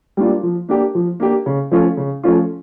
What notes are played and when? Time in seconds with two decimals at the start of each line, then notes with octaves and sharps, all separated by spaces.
0.17 G3 A#3 D4 F4
0.43 F3
0.69 A#3 D4 G4
0.95 F3
1.20 A#3 D4 G4
1.46 C#3
1.71 F3 A3 C#4 F4
1.97 C#3
2.23 F3 A3 C#4 F4